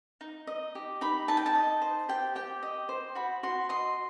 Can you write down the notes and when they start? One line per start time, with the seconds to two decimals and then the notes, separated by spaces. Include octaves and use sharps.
0.21 D#4
0.47 D#5
0.75 G4
1.01 D#4 B5
1.28 D#4 A5
1.37 G5
1.46 A5
1.55 D#5
1.82 C5
2.09 G4 G5
2.35 G4 G5
2.63 D#5
2.89 C5
3.15 F#4 B5
3.43 F#4 C6
3.69 D#5 C6